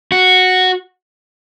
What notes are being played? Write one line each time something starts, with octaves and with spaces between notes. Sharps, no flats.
F#4